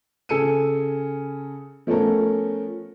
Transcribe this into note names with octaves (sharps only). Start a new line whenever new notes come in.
C#3 A4 G#5 E6 C#7 D#7
F3 A3 B3 C#4 A4 A#4